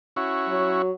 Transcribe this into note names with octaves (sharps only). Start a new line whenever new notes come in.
C#4 E4 F#4
F#3